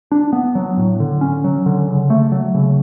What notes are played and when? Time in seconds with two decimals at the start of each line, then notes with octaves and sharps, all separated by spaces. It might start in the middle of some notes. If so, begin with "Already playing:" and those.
0.12 D4
0.33 B3
0.55 F#3
0.77 A2
1.00 D3
1.21 C#4
1.44 F#3
1.66 D3
1.88 C#3
2.10 A3
2.32 F#3
2.55 C#3